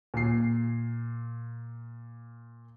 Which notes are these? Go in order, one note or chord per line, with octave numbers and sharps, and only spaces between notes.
A#2 C7